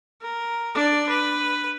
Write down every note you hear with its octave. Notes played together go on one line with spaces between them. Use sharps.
A#4
D4 D5
B4